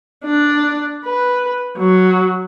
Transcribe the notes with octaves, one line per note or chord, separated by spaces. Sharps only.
D4
B4
F#3